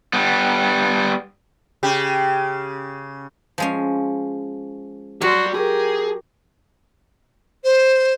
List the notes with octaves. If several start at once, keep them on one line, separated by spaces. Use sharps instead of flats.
G3 B3
C#3 G4
F3 G#3 C#4
F#3 F#4 G4 D5 C6
G4 G#4 A#4
C5